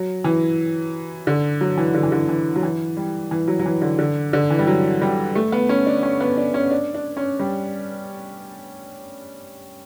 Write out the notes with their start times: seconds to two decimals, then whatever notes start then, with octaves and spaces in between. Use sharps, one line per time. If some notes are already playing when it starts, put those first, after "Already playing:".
Already playing: F#3
0.24 E3
1.27 D3
1.61 F#3
1.77 E3
1.94 D3
2.03 E3
2.12 D3
2.29 E3
2.56 F#3
2.63 E3
2.97 G3
3.31 E3
3.48 F#3
3.59 F#3
3.66 E3
3.82 D3
3.99 D3
4.33 D3
4.50 E3
4.59 G3
4.67 F#3
5.02 G3
5.35 A3
5.52 B3
5.69 C#4
5.86 D4
6.03 C#4
6.20 B3
6.37 D4
6.54 C#4
6.71 D4
6.95 D4
7.17 C#4
7.40 G3